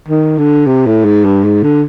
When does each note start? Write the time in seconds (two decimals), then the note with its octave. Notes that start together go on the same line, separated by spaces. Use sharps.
0.09 D#3
0.38 D3
0.67 C3
0.87 A2
1.05 G#2
1.25 G2
1.44 G#2
1.63 D3